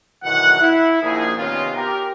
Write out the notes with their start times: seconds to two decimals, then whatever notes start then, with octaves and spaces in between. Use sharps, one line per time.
0.24 B1 B2 D#3 E3 F#5
0.61 E4
1.03 A#1 A#2 D#4 G#4
1.38 C3 D#3 B3 C#4 D#4 F4
1.75 G4 A#4